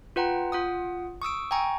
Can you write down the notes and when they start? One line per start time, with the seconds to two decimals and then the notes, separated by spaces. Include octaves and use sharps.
0.16 F4 B4 F#5 G5 A#5
0.52 F4 F#5 D#6
1.22 C#6 D#6 E6 D7
1.51 G5 G#5 A#5 C#6